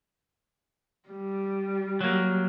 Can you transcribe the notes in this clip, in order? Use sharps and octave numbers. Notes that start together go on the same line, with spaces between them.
G3
F#3 A#3